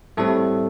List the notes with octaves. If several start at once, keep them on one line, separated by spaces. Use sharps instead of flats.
A2 G3 A3 C4 A4